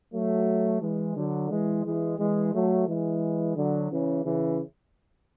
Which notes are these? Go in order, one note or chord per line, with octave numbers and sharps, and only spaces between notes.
F#3 A3
E3 G#3
D3 F#3
E3 G#3
E3 G#3
E3 G#3
F#3 A3
E3 G#3
D3 F#3
C#3 E3
C#3 E3